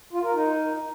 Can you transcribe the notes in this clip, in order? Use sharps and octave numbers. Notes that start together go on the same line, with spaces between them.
F4
A#4
D#4